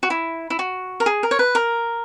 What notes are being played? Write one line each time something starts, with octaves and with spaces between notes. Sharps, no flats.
F#4
E4
E4
F#4
A#4
G#4
A#4
C#5
B4
A#4